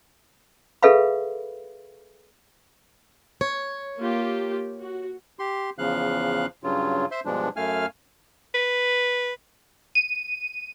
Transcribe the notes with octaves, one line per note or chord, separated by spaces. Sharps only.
G#4 A4 B4 E5 F5 B5
C#5
A#3 F4 G4
F#4
G4 C6
E2 C#3 F3 F5 F#6
G2 C#3 F#3 F4
C5 E5 C6
G2 B2 F3 G#3 D4
F#2 A3 F5 G#5 F6
B4
D#7